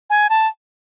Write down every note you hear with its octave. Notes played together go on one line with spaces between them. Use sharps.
G#5
A5